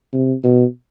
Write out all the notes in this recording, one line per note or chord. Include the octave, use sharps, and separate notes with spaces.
C3
B2